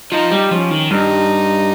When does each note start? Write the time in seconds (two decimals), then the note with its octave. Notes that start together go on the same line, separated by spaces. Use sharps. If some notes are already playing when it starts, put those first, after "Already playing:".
0.12 F3 D#4
0.31 G3
0.51 F3 C#4
0.71 D#3
0.91 G2 D#4